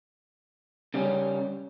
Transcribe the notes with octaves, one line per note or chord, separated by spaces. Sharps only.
C#3 G3 C#4